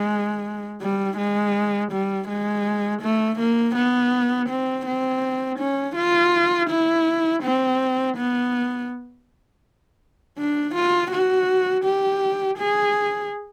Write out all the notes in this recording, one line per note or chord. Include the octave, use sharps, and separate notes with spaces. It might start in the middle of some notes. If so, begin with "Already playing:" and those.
Already playing: G#3
G3
G#3
G3
G#3
A3
A#3
B3
C4
C4
C#4
F4
E4
C4
B3
D4
F4
F#4
G4
G#4